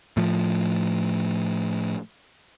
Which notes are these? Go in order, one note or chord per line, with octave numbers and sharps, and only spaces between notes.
A2 F3